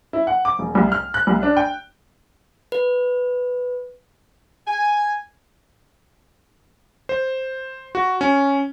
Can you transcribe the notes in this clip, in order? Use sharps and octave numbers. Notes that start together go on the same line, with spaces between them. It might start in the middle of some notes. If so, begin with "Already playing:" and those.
E4
F#5
D6
E1
C2
F6
F#6
C2
D4
G5
B4
G#5
C5
F#4
C#4